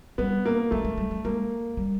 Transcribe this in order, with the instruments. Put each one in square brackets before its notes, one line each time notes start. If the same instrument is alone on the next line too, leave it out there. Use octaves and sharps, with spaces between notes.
[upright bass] G3 [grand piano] B3
[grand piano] A#3
[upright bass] G#3 [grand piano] A3
[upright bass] G#3
G3
G3
[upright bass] G#3 [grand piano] A#3
[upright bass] G3